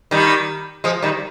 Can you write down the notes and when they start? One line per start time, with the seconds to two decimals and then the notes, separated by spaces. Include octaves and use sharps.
0.11 D#3 G3
0.84 F3 G#3
1.02 D#3 G3